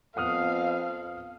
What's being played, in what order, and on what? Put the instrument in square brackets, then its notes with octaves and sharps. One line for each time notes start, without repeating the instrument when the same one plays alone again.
[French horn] F2 [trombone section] B3 A4 [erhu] F5 [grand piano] F#5 D#6 F6